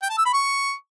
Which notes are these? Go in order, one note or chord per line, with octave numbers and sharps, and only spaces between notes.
G5
A5
E6
B5
C#6